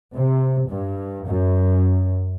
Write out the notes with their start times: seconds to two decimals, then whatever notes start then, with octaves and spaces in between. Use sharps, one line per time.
0.15 C3
0.68 G2
1.26 F#2